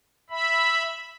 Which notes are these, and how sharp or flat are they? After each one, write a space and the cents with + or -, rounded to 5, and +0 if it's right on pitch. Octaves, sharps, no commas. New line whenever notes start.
E5 +0 B5 +0